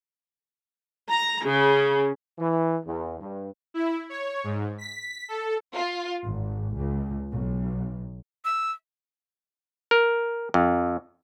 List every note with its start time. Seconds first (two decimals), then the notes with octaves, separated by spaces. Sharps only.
1.10 A#5
1.46 C#3
2.39 E3
2.85 E2
3.20 G2
3.74 E4
4.09 C#5
4.44 G#2
4.78 B6
5.28 A4
5.74 F4
6.24 G#1
6.76 C#2
7.32 B1
8.45 E6
9.91 A#4
10.54 F2